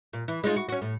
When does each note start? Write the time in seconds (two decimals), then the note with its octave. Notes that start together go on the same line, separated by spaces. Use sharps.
0.13 A#2
0.28 E3
0.44 G#3 D#4 F4
0.56 F#4
0.69 C#4 F#4
0.82 A2